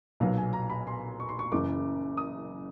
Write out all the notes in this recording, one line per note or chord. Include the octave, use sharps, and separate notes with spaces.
B1 A#2 F#3 B3 F5
G#5
A#5
B5
C6
C#6
C6
C#6
F#1 F#2 C#3 E3 D6
D#6